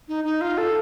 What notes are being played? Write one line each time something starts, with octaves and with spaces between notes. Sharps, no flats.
D#4
D#4
F4
A4